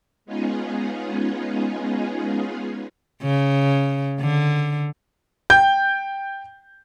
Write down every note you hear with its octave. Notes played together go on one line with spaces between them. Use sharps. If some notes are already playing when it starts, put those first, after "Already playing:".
G#3 B3 C#4 D#4 F4 G#4
C#3
D3
G5 G6